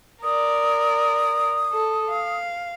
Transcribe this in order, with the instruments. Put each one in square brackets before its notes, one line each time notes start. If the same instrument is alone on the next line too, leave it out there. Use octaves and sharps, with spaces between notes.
[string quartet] A#4 D5 [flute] D#6
[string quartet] A4
F5